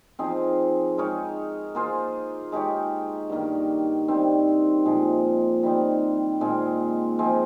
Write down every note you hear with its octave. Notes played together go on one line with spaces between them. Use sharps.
F3 C4 D#4 G#4
G#3 D#4 A#4 C#5
A#3 F4 G#4 C5
G#3 D#4 G4 C#5
G2 D#3 A#3
D#3 G3 C4 D#4
A#2 F3 G#3
D#3 G3 C4 D#4
A#2 G#3 C4
F3 G#3 C4